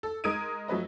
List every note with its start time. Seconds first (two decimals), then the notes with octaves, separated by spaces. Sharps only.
0.03 A4
0.24 G#3 A#4 D#6 G#6 D7 D#7
0.68 F3 F#3 A3 B4 D#5